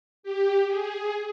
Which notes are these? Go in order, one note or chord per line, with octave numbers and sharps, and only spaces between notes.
G4
G#4